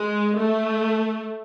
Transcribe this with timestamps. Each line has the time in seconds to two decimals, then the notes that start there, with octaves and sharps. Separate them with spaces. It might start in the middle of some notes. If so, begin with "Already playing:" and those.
Already playing: G#3
0.38 A3